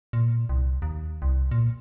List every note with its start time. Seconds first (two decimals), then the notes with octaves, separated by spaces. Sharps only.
0.13 A#2
0.49 C2
0.82 D#2
1.22 C2
1.51 A#2